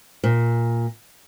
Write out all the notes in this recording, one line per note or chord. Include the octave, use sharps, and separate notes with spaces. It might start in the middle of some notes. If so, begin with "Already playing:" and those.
A#2